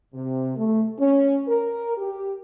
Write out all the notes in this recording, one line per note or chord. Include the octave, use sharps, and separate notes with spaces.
C3
A3
C#4
A#4
G4